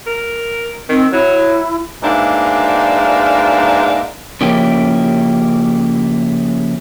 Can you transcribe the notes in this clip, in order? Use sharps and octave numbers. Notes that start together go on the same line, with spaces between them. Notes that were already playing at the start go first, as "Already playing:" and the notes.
A#4
D#3 C4
F#3 E4
G#2 B2 A#3 D4 E4
C#3 F3 A#3 C#4 E4 G4